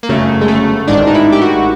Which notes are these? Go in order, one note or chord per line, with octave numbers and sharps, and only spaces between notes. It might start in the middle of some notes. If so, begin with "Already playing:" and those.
A#3
G1 F#2 C#3 A3
G#3
A3
A1 G#2 D#3 G#3 D4
D#4
E4
G4
F#4